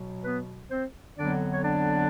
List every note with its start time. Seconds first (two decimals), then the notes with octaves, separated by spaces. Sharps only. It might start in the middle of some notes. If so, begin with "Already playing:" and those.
Already playing: B2 F#3
0.25 B3 B4
0.71 C4 C5
1.17 F2 D3 F#3 B3 D4 D5
1.53 C#5
1.64 D4 D5